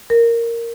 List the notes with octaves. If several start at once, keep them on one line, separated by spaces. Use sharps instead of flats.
A#4